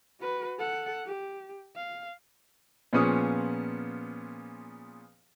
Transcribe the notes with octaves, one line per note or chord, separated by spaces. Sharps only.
F#4 B4
A4 F#5
G4
F5
A#2 F3 B3 C#4 G#4 D#6